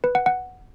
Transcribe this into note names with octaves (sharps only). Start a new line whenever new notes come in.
B4
F#5
F#5